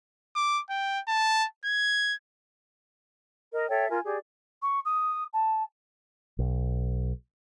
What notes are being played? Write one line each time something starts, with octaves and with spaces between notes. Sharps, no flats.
D6
G5
A5
G#6
A#4 D#5
A4 C#5 E5 G5
F4 A#4 G#5
G4 G#4 D5
C#6
D#6
A5
B1